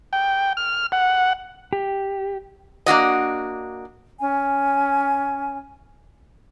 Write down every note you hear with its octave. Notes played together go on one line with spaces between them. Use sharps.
G5
F6
F#5
G4
A#3 D4 F#4 D#5
C#4 G#5